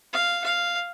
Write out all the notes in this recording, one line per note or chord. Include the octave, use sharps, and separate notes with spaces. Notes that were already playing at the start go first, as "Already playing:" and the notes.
F5
F5